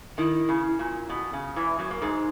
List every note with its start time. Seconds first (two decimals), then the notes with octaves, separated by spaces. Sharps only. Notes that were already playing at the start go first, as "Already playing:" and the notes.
0.18 D#3 E4
0.49 C#3
0.79 A#2
1.09 B2
1.33 C#3
1.56 E2 E3
1.79 F#2 F#3
1.91 A#3
2.01 G#2 G#3 D#4